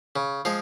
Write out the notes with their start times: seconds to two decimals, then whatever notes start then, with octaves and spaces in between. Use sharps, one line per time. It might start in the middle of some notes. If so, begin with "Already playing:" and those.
0.16 C#3
0.45 F3 G#3 F5